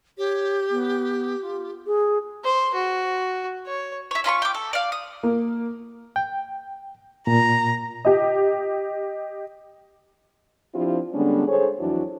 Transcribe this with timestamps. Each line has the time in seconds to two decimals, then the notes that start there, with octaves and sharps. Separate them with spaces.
0.18 G4 C#5
0.70 B3
1.41 F4
1.86 G#4
2.44 C5
2.74 F#4
3.67 C#5
4.11 C#5 E5
4.24 C#4 F4 B5 C#6
4.42 G5 D6
4.54 A4
4.73 D5 F5
4.92 D#6
5.23 A#3
6.16 G5
7.27 A#2 A#5
8.05 G4 D#5
10.74 F3 C4 D4 E4 F4 G4
11.13 D3 G3 G#3 B3 C#4 D4
11.47 G#4 A4 C5 C#5
11.79 F2 E3 F#3 D4 E4 F#4